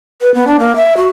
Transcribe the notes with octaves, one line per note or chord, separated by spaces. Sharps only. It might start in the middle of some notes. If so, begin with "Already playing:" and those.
B4
B3
D4
A#3
E5
F#4